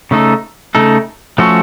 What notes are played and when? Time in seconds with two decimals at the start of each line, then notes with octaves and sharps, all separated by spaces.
0.11 C#3 A3 D#4 A4
0.75 C#3 A3 D#4 A4
1.38 F3 A3 C#4 F#4 A4